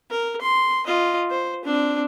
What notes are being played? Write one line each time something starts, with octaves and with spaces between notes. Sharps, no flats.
A#4
C6
F4 D#5
C5
C4 D4